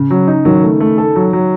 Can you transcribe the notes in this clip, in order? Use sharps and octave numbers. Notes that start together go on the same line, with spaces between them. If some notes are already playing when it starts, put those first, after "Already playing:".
Already playing: C#3
F#3
D#4
D#3 F#3
A3
A3
A4
F#3
F#3